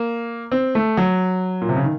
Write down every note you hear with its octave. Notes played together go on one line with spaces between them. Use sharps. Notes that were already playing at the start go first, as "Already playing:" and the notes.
Already playing: A#3
C4
A3
F#3
A#2
C3
C#3
D#3